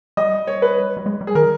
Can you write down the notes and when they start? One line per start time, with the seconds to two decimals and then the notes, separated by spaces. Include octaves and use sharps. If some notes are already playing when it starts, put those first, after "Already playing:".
0.17 G3 D#5
0.47 C#5
0.62 B4
0.97 G3
1.06 G#3
1.21 G3
1.27 G#4
1.35 D#3 A#4